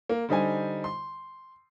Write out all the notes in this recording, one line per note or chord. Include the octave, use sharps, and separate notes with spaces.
A#3
D3 G3 D#4 C5 G#5
C6